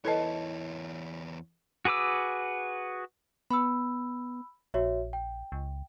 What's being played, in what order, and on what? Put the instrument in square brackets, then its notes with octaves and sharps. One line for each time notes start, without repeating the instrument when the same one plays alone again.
[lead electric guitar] E2 C#5 [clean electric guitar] E4 A5 [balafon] A4 B4 D#5
[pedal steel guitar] F#4 G#4 B4 D6 E6
[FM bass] B3 [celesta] B5 E6
[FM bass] A#1 [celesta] F#4 C#5 E5
[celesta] G5
[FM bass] C#2